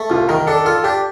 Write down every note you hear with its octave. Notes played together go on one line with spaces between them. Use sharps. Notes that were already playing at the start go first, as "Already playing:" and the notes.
Already playing: A3
C2 F4
D#3 A#4
D4 A4
F4 A4
D4 G4